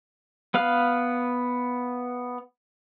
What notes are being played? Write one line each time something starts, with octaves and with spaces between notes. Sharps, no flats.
B3 B4 F5 F6